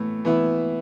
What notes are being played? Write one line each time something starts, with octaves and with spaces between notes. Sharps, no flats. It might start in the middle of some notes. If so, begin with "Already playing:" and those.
Already playing: A2 E3 B3
E3 B3 E4